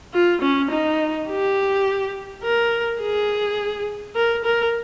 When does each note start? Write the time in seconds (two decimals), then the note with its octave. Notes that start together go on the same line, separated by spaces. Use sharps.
0.14 F4
0.41 C#4
0.71 D#4
1.29 G4
2.43 A#4
3.01 G#4
4.15 A#4
4.44 A#4